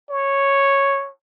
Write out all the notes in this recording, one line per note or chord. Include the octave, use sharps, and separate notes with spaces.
C#5